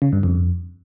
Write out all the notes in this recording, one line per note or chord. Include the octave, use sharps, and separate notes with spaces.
C#3
G2
F2